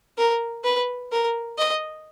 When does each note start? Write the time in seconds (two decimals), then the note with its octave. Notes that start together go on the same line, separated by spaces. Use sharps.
0.18 A#4
0.64 B4
1.11 A#4
1.58 D#5